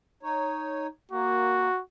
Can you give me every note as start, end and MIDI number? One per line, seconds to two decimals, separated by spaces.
0.23 0.87 63
0.23 0.87 73
1.12 1.69 58
1.12 1.81 66